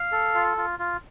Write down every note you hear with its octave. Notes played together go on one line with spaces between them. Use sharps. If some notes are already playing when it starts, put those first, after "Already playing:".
Already playing: F5
A4
F4
F4
F4